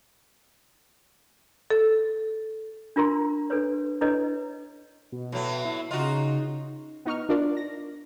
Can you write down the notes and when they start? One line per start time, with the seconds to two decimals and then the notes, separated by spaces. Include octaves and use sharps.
1.70 A4
2.96 D4 F4 A#4 A#5 C6
3.50 D4 A4 B4 C#5
4.01 D4 E4 A4 B4 C#5 D#5
5.12 B2
5.32 A2 F#3
5.65 E4
5.91 C#3 D#4 F4 F#4
7.05 B3 D#4 C#6 F6
7.29 D4 F4 A#4 D5
7.57 A#6